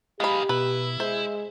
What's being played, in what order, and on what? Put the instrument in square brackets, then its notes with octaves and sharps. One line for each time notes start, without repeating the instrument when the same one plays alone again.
[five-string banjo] G#3 B5 [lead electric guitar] B3 D#4 [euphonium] G4 [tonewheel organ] F5
[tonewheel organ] B2 [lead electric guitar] E4 [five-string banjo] B4
[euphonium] G#3 [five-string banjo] C5 [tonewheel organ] E5